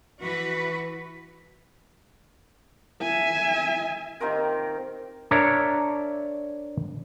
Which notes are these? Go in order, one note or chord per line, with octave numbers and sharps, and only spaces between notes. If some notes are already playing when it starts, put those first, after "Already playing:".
E3 F#4 B4
E5 G#5
C3 D#3 F4 A#4
D4 A#4 C#5 E5 A#5